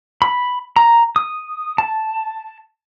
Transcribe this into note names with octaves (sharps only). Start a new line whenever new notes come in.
B5
A#5
D#6
A5